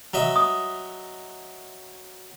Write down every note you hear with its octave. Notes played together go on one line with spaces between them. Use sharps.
F#3 D#5 E5
D#6